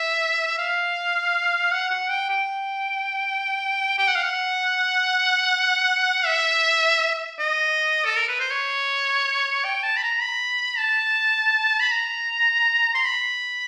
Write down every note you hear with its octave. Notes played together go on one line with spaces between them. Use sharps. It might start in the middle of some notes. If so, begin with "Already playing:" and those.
Already playing: E5
F5
F#5
F#5
G5
G5
G5
F#5
F5
F#5
E5
D#5
A4
A#4
B4
C5
C#5
G5
A5
B5
A#5
B5
A5
B5
A#5
C6
B5